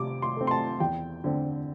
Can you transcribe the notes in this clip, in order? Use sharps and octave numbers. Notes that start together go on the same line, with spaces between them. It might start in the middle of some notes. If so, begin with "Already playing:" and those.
Already playing: C3 C4 D6
C6
A3 C4
C6
A5
E2 G5
D3 C4